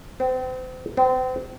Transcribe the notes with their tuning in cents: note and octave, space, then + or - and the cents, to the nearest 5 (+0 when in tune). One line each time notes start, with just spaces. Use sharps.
C4 -35
C4 -35